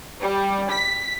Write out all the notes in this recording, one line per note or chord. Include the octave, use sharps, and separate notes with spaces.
G3
B6